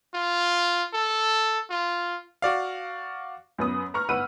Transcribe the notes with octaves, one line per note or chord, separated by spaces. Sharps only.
F4
A4
F4
F#4 D5 F5
F#2 B3 D#6
B4 A#5 C#6 F6
G1 B4 F#5 E6 D#7